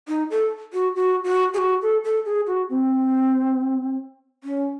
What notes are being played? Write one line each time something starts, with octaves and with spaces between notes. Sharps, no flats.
D#4
A4
F#4
F#4
F#4
G#4
F#4
A4
A4
G#4
F#4
C4
C#4